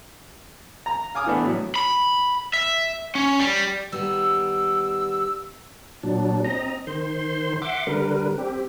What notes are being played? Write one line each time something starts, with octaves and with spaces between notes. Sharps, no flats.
A#5
F5 G#5 D6 D#6 F6
E3 A3 B3 D4
A2 F#3
B5
E5
C#4
G3
D#3 G3 B3 E6
A#2 F#3 D4
C4 D#5 A#5
D#3 C5 C6
E5 F#5 C6 D6
D3 G3 A#4 B4
C4 G4